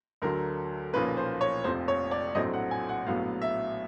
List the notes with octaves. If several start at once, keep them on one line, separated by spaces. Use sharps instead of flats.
D2 D3 F#3 A3 A#4
B1 A#2 F3 A#3 C#4 B4
C5
C#5
F1 F2 C3 F3 C5
C#5
D5
A#1 A2 F#3 A3 C4 D#5
F#5
G#5
F#5
A#1 A2 F#3 B3 F5
E5